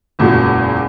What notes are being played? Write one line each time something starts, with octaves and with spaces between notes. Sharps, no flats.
F#1 E2 A#2 G#3 F#4